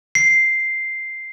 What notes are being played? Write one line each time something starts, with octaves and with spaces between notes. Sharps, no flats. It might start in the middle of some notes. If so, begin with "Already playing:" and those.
C7